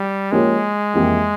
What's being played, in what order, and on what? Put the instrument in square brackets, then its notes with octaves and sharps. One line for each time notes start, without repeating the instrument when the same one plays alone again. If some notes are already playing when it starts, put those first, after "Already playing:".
Already playing: [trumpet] G3
[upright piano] F3 A#3 C#4 G4 [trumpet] G#3
[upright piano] F2 E3 A#3 E4 G4